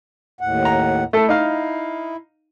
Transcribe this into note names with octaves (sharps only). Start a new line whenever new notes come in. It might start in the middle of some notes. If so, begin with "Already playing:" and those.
D#2 A2 F#5
A#5
A3 E4 A4
D#4 F5